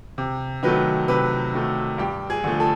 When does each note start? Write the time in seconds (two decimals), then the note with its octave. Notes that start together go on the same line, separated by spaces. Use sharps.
0.18 C3
0.63 D#3 F#3 A3 B4
1.08 C3 B4
1.54 D#3 F#3 A3
1.98 G2 G4
2.30 G#4
2.44 D3 F3 A3
2.60 A4